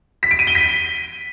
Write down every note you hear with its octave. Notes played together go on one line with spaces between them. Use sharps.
B6
D7
D#7
G7
B6